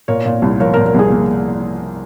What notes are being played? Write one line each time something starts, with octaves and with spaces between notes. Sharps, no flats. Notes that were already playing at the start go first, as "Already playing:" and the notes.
A#2 A#4 C#5
A#2
C2
F3 A#4 C#5
A#4
A#2
A#4
C2 G#4
A#3